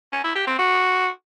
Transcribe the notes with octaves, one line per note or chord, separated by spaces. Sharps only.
C#4
E4
G4
C4
F#4